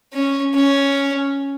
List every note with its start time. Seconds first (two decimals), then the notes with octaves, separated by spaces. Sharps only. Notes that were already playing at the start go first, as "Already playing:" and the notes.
0.13 C#4
0.54 C#4